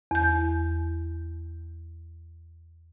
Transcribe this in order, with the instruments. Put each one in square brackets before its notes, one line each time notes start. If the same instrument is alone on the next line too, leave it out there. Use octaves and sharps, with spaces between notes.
[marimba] E2 G6